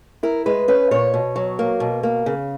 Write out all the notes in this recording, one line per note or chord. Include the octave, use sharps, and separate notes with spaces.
E4 A#4
G#3 B4
C#4 B4
A#2 C#5
B2
F#3
A#3
B2
A#3
C#3